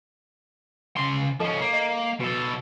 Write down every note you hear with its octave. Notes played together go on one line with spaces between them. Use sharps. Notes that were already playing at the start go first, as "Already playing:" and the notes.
C#3 C6
F3 C#4 D#4 A4 D#5
A#3
D#5
B2 F#4 A4